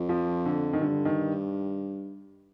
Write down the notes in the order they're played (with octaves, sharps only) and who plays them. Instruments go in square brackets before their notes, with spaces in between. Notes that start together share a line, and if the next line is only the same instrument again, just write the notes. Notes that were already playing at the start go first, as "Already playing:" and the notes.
Already playing: [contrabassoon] F2
[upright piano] F3
D3
D#3
[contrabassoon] G2 [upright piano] D3
[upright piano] D#3